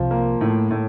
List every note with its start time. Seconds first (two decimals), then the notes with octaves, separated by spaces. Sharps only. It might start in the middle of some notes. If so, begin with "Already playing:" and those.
Already playing: C2 C3 F3
0.11 A#3
0.41 A2
0.71 A2